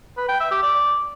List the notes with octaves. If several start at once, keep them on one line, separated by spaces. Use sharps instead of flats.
B4
G5
E5
G4
D5